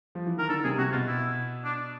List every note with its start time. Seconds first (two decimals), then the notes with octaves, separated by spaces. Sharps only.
0.15 F3
0.27 E3
0.38 D#3 A#4
0.49 D3 A4
0.64 C3 G#4
0.78 C3 F#4
0.92 B2 F4
1.08 E4
1.65 D4